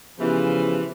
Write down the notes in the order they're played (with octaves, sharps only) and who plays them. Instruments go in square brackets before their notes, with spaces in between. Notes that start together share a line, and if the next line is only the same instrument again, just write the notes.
[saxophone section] C#3 E3 F3 [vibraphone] B3 G4